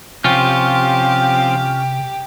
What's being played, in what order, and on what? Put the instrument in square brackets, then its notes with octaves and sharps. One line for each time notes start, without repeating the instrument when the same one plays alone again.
[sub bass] C3 [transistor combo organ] F3 C4 [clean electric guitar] C#4 F4 [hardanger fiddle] G4